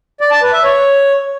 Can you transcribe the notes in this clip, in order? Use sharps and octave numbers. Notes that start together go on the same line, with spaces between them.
D5
A5
B4
E5
C#5